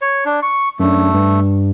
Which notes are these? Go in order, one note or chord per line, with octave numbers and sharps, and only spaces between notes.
C#5
D4
C#6
F#2 A3 D4
G2